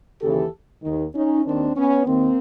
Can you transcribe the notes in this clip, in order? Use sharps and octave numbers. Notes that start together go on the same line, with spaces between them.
D#2 C#3 E3 G4 A4
D#2 D#3
C#4 D#4
D#2 D#3 C4 D4
B3 C#4
D#2 D#3 A#3 C4